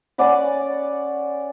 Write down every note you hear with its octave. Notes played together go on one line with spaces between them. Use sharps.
C#4 D5 F#5 B5